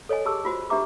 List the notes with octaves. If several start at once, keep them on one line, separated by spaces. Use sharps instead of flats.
A4 C#5 D#5 G#5
G4 G#4 A5 D6 E6
F4 F#4 C5
D4 G4 B4 E5 A#5 D6